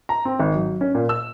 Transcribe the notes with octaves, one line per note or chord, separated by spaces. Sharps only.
A#5
C4
G#1
F#3
C#4
A#2
E6